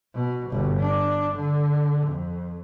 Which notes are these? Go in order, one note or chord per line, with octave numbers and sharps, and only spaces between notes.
B2
G1 B2
D4
D3
F2